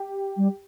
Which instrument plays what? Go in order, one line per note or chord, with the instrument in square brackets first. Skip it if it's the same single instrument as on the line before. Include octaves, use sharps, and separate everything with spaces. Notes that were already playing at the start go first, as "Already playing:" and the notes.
Already playing: [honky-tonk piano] G4
[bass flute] G3